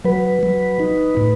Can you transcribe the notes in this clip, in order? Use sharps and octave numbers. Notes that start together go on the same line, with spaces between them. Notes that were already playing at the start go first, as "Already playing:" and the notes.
F#3 B4
F#3
D#4
A2